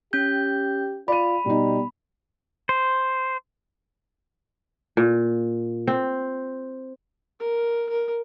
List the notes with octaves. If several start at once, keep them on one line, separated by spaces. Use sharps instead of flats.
C#4 G4 G6
F4 D5 B5 D#7
B2 G3 D#4
C5
A#2
C4
A#4
A#4